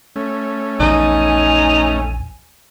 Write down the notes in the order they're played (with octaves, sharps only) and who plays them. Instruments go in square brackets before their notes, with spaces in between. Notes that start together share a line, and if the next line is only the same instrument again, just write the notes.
[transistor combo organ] A3 C#4
[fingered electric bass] A#1 E2 E3 [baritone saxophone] D#4 [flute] G#5